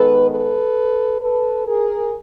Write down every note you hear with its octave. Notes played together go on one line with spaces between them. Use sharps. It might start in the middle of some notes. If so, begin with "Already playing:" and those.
Already playing: D#3 G#3 B3 A4 B4
A4 B4
A4 B4
G#4 A#4